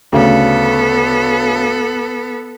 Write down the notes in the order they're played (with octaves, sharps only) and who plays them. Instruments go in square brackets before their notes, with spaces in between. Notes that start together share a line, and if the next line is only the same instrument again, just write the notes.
[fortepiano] D2 C#3 [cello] B3 A4